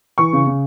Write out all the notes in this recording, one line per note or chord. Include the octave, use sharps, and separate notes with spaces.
E3 C#6
C#3
C#3